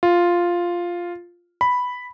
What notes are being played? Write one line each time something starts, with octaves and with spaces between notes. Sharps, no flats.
F4
B5